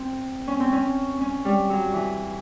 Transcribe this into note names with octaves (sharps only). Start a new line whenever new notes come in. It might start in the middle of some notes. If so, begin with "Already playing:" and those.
Already playing: C4
C#4
C4
C#4
C#4
G3
F#3
E3